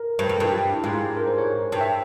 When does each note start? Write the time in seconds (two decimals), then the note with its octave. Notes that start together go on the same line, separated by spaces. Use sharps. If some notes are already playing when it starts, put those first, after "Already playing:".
Already playing: A#4
0.19 G2 C5
0.29 F2 A#4
0.40 G2 F4
0.52 G4
0.73 E4
0.84 G#2 F4
0.95 F4
1.05 G4
1.17 A#4
1.27 C5
1.38 C#5
1.72 G2
1.81 E5